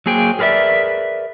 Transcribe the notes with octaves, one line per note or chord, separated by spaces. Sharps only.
F#3 A#3 G#4 C5 G5
G#4 A#4 B4 D5 E5